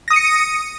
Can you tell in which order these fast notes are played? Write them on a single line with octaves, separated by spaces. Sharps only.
A#6 D#6 D#7 C#7